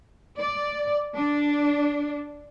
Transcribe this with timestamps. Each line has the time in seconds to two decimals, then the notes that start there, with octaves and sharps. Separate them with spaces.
0.38 D5
1.14 D4